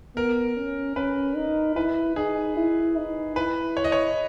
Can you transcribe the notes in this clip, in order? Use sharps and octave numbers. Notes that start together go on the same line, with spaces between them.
B3 A#4
C#4
C#4 B4
D#4
E4 B4
D#4 G#4
E4
D#4
E4 B4
C#5
D#5
C#5